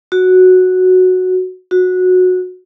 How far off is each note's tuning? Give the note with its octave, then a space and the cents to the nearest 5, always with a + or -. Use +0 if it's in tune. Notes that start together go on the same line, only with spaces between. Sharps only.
F#4 -5
F#4 -15